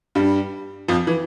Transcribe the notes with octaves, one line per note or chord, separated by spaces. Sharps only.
G2 G3
F2 F3
E3